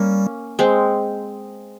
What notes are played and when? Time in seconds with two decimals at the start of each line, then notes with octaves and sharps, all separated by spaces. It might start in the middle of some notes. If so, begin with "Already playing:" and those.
Already playing: G3 A#3 C#4
0.59 G#3 C4